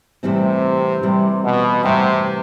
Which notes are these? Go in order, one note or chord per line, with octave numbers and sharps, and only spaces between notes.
A2 C3 E3 G3 C4
A2 C3 E3 G3 C4
B2
A2 C3 E3 G3 C4